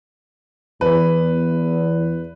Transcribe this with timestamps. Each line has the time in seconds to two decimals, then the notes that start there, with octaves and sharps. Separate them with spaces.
0.81 E2 B4